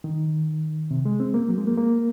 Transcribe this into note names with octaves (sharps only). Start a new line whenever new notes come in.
D#3
C3
G#3
C4
A#3
F#3
G#3
A#3
A#3